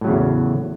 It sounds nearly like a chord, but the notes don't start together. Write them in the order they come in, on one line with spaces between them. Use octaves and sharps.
A2 F#3 C#3 E2